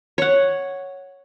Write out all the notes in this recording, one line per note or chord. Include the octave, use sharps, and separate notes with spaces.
C#5 F#5